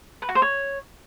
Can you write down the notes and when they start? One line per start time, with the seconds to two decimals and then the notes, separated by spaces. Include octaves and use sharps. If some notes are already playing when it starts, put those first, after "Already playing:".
0.22 B4
0.29 F#4
0.35 C5
0.42 C#5